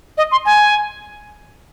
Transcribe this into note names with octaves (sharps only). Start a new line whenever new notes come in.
D#5
C6
G#5